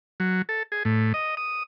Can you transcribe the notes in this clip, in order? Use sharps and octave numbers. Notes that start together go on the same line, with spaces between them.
F#3
A4
G#4
A2
D#5
D#6